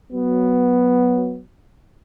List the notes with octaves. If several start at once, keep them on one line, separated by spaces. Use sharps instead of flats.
F#3 B3